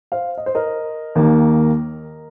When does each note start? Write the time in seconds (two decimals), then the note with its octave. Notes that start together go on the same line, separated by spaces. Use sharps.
0.12 C5 F5
0.37 D#5
0.46 C5
0.55 A#4 D#5
1.15 D#2 D#3 A#3